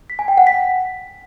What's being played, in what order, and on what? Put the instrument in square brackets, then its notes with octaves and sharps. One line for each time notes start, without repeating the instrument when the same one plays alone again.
[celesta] B6
G#5
G5
F#5
B6